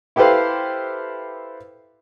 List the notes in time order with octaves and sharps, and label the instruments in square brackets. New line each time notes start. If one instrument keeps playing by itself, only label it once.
[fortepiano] E4 G4 A4 B4 C5 F5